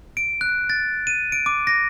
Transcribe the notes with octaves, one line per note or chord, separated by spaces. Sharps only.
D7
F#6
A6
D#7
D7
D6
A#6